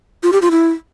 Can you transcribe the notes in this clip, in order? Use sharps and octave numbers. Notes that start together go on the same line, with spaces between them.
F4
G4
F4
E4